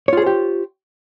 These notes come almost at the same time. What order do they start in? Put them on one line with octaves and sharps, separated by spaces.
C#5 F4 G#4 C5 G4